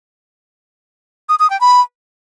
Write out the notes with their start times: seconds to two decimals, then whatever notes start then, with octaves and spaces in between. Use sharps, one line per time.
1.29 D#6
1.39 D#6
1.50 G5
1.61 B5